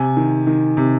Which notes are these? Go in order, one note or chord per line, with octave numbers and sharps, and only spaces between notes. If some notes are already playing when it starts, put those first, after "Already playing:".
Already playing: C3 G#5
D#3
D#3
C3